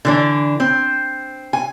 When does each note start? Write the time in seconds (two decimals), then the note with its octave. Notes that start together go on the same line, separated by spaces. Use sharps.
0.05 D3 E3 D4
0.60 C4
1.53 G#5